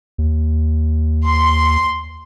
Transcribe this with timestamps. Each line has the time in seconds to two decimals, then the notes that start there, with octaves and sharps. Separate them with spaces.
0.18 D#2
1.26 C6